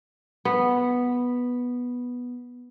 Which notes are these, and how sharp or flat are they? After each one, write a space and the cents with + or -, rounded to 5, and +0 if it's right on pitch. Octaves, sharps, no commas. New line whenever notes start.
B3 -5